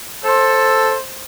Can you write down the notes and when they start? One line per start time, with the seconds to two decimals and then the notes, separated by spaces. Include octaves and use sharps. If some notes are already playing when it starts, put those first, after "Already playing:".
0.24 A4 C5